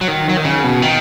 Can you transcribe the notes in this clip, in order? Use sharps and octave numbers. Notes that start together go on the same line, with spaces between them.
F#3
D#3
F#3
D#3
C#3
B2
D#3